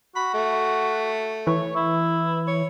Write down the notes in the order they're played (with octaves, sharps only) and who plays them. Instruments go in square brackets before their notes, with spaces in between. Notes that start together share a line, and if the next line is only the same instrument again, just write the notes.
[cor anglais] F#4 [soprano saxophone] B5
[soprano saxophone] A3
[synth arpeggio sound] E3 [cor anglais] C#5
[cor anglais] E4
[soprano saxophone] C#5